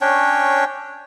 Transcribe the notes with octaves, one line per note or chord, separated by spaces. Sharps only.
C#4 D4 C#5 G5